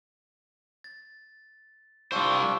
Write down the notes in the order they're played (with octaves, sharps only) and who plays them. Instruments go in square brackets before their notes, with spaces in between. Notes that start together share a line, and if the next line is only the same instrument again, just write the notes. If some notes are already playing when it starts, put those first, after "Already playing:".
[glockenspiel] A6
[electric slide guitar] G3 C5 [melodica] D4 F4 G5 [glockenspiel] C#6 E6